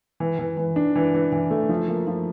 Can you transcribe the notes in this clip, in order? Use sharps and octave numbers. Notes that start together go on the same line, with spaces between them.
E3
E3
E3
D4
E3
E3
E3
A3
F3
A#3
F3